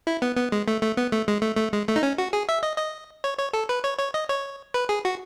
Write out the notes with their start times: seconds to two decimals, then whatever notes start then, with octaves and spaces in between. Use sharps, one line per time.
0.07 E4
0.22 B3
0.37 B3
0.52 G#3
0.68 A3
0.82 A3
0.97 B3
1.12 A3
1.28 G#3
1.42 A3
1.57 A3
1.73 G#3
1.88 A3
1.96 D#4
2.03 C#4
2.18 F#4
2.33 G#4
2.49 E5
2.63 D#5
2.78 D#5
3.24 C#5
3.38 C#5
3.53 A4
3.69 B4
3.84 C#5
3.99 C#5
4.14 D#5
4.29 C#5
4.74 B4
4.89 G#4
5.05 F#4